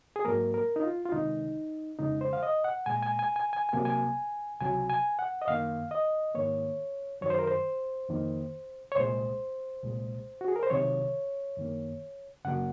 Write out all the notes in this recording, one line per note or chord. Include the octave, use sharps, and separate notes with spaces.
G#4
G#2 F#3 A#3 A#4
A#4
D#4
F4
F4
C2 C3 D#3 G#3 D#4
F2 C#3 G#3 D#4
C5
F5
D#5
F#5
A#2 G#3 G#5
G#5
G#5
G#5
G#5
G#5
C2 C3 F#3 A#3
G#5
C#2 C3 F#3 G#5
G#5
F#5
D#5
F#2 D#3 A#3 F5
D#5
G#2 D#3 A#3 C#5
F#2 D#3 F#3 C#5
C5
A#4
C5
F2 D#3 A#3
C#5
C2 A#2 G#3 C5
C2 A#2 G#3
F#4
G#4
A#4
C5
C2 C3 D#3 F#3 C#5
F#2 D#3 A#3
F#2 C#3 F#3 A#3 F#5